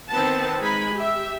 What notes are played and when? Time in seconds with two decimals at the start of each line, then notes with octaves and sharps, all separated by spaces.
0.10 D#3 B3 C4 B4 F#5 A5
0.60 G#3 D#4 G#5 B5
0.95 G4 E5